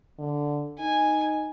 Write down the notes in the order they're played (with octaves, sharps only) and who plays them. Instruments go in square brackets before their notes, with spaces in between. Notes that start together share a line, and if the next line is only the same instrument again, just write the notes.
[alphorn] D3
[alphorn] D#4 [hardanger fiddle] G#5